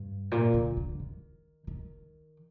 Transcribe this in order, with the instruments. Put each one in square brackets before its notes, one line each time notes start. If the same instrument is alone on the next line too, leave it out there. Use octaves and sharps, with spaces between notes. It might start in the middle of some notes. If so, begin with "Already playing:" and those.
Already playing: [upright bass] G2
A#2
D3
D3
D#3
D#3